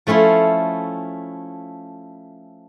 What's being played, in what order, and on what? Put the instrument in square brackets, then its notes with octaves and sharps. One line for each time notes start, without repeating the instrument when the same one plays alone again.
[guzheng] F3 A3 C#4 E4 C6